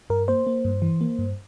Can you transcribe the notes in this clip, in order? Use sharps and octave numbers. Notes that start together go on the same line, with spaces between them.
G2 A#4
A#3 C5
A#3
G2
E3
A#3
G2